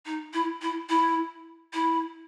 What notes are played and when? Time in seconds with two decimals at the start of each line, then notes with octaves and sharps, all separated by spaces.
0.05 D#4
0.33 E4
0.62 E4
0.89 E4
1.73 E4